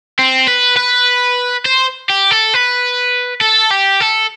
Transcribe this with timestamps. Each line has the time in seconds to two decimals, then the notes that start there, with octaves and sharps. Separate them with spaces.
0.19 C4
0.48 B4
0.77 B4
1.65 C5
2.10 G4
2.31 A4
2.54 B4
3.41 A4
3.71 G4
4.00 A4